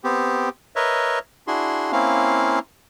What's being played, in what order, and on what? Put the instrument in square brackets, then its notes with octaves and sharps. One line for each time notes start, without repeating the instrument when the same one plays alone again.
[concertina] B3 C4 G4
A#4 B4 C#5 D#5 E5
D4 E4 F#4 G#4 C6
A#3 C4 C#4 E4 F5